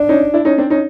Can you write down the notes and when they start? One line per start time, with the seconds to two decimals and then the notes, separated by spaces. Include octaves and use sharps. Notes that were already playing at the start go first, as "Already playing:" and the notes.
Already playing: D4
0.09 C#4 D#4
0.34 D4 E4
0.45 C#4 D#4
0.58 C4 D4
0.70 C#4 D#4